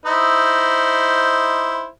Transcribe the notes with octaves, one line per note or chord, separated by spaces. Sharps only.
D#4 E4 C5